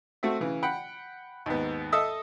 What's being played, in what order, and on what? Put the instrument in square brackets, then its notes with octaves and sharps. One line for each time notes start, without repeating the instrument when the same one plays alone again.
[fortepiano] A3 C4 F#4 E5
C#3 E3
F#5 G5 B5
D#2 G#2 B3
A4 D#5 E5 D#6 E6